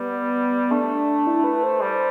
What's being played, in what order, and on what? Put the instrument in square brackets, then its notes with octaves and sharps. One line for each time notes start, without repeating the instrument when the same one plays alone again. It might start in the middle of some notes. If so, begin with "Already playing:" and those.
Already playing: [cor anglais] G3 [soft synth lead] B3
[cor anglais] A3 [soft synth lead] D4
[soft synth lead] E4
B4
C5
[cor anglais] G3